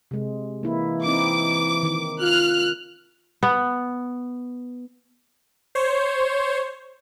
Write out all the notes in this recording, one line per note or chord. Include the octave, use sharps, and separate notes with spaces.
C3 G#3
E3 A#3 E4
C4 D#4 E4 D6
D#3
F4 F6 F#6
B3
C5 C#5